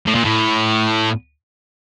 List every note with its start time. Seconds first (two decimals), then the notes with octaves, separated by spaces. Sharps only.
0.06 A2
0.15 A#2
0.25 A2